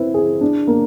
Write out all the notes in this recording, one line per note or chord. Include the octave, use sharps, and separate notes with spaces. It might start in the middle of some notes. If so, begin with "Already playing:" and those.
Already playing: C4 E4 B4
G#4
D4
A#3